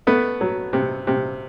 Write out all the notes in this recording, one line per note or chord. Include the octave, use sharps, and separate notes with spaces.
A3 B3
F#3
C3
C3